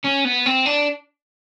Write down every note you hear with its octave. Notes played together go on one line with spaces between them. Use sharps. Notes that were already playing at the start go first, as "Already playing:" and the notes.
C#4
B3
C4
D4